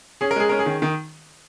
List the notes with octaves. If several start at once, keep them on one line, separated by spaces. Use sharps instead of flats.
C#4 G#4
A#4
G#3 G#4
C#4 A#4
G#4
D#3
D#3